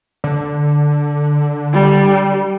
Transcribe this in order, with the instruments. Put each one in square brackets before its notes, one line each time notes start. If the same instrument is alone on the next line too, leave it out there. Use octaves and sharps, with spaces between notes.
[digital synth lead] D3
[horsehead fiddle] G3